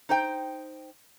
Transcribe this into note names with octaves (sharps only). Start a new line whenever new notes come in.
D#4 C5 G5